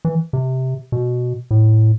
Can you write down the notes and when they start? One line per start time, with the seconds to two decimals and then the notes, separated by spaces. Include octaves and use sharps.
0.05 E3
0.33 C3
0.92 B2
1.51 A2